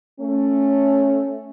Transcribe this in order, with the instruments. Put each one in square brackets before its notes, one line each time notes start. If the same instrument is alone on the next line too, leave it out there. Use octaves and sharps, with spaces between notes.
[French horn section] A3 C#4